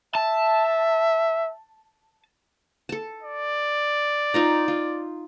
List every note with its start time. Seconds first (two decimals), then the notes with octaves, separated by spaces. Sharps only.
0.15 E5 A5
2.89 A4 A5
3.23 D5
4.34 D#4 F4 A#5
4.68 F4